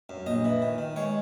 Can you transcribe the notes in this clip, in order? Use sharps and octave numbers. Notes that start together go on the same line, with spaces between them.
F#2
A#1 D#5
E3
D#3
D#3
G#3 C#5